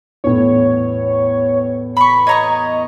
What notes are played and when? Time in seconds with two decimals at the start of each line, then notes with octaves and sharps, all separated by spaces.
0.24 E2 A2 C#5
1.97 B5 C#6 B6
2.27 C#5 D#5 A#5 C#6